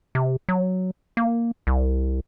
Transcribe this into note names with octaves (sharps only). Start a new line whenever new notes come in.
C3
F#3
A#3
C2